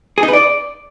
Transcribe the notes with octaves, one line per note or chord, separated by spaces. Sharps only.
G#4
D#4
B4
D5